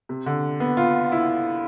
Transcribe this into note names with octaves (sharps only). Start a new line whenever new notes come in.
C3
D3
B3
F4
E4